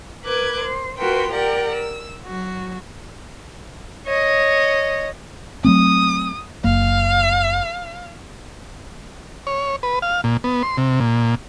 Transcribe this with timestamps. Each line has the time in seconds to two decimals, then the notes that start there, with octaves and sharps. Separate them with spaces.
0.24 A#4 B4 D6 F#6 G#6
0.64 C5
0.97 F4 F#4 A#4 B4 G5 C6
1.33 G4 A#4 D5 F#5 G5
1.72 E6
2.26 F#3 F#4
4.07 C#5 D#5
5.65 F#3 A3 C4 D#6
6.64 F#1 A#3 F5
9.47 C#5
9.83 B4
10.02 F5
10.24 A#2
10.44 B3
10.63 C6
10.77 C3
11.00 A#2